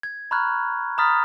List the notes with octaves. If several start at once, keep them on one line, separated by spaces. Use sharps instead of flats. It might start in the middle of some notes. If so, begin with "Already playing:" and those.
G#6
A#5 B5 C#6 F6 F#6 G#6
A#5 B5 D#6 F6 A6 B6